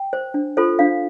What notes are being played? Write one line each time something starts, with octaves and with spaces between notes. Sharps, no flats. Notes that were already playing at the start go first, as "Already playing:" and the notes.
Already playing: G5
C5
D4
F4 A4 C5
D4 F5